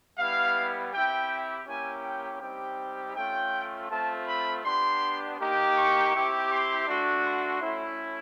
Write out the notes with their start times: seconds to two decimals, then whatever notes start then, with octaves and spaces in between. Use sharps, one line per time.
0.18 G3 B3 E4 F5
0.92 C4 E4 G4 G5
1.67 A#3 C#4 E4 G4 G#5
2.03 G5
2.41 G3 C4 D#4 G4 G5
3.16 A3 C#4 F4 G5
3.90 A3 C4 F4 A5
4.27 B5
4.64 B3 D4 G4 C6
5.39 A#3 D#4 G4
5.76 C#6
6.13 C4 E4 G4
6.50 C6
6.87 A3 D4 F#4
7.24 C6
7.62 A3 C#4 E4